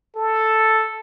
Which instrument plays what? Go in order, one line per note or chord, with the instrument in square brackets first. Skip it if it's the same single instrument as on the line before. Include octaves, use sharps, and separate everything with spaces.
[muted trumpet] A4